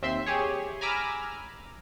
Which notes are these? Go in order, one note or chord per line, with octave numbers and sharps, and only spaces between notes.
D#2 C4 E5 C6
G4 G#4 C#5
G#5 A#5 B5 D6 E6 F6